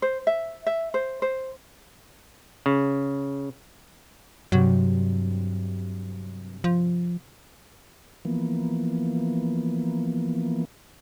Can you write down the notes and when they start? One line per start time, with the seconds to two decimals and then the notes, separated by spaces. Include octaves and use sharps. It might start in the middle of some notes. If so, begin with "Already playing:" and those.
0.02 C5
0.27 E5
0.66 E5
0.94 C5
1.22 C5
2.66 C#3
4.52 G2 C3 F#3
6.64 F3
8.25 E3 F3 A#3 B3